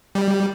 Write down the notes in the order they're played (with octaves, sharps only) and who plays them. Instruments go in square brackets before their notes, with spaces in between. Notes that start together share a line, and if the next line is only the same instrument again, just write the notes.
[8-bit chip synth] G3